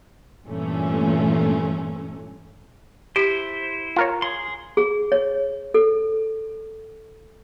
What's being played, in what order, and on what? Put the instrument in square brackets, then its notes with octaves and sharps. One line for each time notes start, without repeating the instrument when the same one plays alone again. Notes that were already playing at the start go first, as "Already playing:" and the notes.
[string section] G2 A#2 E3 A3 C#4
[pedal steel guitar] E4 C5 [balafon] G4
[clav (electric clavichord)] F4 A#4 C#5
[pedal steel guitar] G#4 C6
[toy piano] G#4
C#5
A4